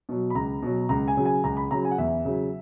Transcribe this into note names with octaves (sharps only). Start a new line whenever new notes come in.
B2 F#3
B5
C#2 A#5
B2 F#3
C#2 A#5
G#5
C#3 F#3
G#5
C#2 A#5
B5
C#3 F#3 A#5
G#5
F#5
E2 E5
C#3 F#3